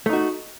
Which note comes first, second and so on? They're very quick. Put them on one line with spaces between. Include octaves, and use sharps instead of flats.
A3 D#4 F#4